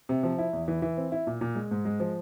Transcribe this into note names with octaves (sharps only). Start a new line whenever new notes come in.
C3
F3
E4
E2
E3
E3
C4
E4
A#2
A#2
G#3
G#2
G#3
F3